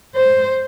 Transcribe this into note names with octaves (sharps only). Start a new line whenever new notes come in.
C5